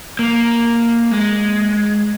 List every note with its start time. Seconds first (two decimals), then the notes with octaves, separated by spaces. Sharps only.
0.19 A#3
1.11 G#3